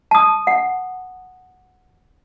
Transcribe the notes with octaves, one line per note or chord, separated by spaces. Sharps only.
A5 D#6
F#5